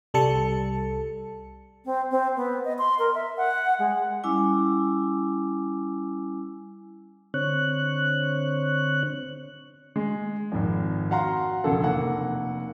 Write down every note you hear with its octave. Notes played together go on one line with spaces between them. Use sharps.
C2 G3 A4 A5 C#7
C4
C4
B3
D#5
C6
A#4
E5
F#5
G#3
G3 C#4 E4 G#5 D6 E6
D3 C4 C#5 F#6
G#3
G#1 F2
F#4 F5 F#5 A#5 C6
E1 A1 F2 C#3 A4 F#5
F1 A#3 F#5